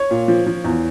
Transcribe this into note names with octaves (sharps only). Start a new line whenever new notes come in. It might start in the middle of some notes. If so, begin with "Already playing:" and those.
Already playing: C#5
A#2
F3
F3
E2